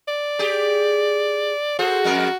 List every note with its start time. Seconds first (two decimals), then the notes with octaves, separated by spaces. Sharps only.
0.08 D5
0.39 G4 G#4
1.79 F#4 G#4 A4 C5
2.04 F2 G#3 A#4